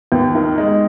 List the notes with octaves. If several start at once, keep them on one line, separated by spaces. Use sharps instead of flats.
D#2 B3
D#3
G#3